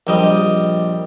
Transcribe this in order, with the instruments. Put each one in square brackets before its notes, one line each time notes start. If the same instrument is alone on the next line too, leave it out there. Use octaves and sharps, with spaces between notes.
[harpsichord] A#1 G3 D#5